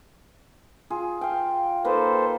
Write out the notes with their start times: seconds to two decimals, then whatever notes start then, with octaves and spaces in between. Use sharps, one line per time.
0.90 F4 G#4
1.21 F5 G5
1.85 A#3 D#4 A4 B4 C5